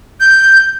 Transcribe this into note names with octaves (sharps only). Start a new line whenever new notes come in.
G6